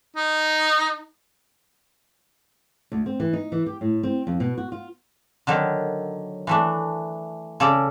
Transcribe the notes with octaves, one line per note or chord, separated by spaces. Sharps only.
D#4
D2
C4
E3
D#4
E3
G4
A2
C4
F2
B2
F#4
F4
D3 D#3 F#3
E3 A3 D4
C#3 A4 D5